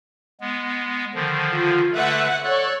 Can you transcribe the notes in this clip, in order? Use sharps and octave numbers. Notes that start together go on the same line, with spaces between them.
G#3 B3
D3 D#3 F3
F4
D3 A3 B4 E5 F#5
A4 C#5 D5 F#6